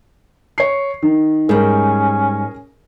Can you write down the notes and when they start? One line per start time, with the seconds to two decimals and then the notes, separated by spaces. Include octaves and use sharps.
0.58 C#5 C7
1.02 D#3
1.49 G#2 G3 C#4 G#4 A#4